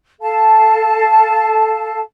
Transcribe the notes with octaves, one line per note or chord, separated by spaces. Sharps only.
A4 F5 A5